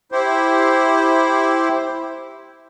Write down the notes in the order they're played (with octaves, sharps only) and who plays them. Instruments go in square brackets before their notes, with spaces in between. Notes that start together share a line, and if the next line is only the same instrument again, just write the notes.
[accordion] E4 G4 C5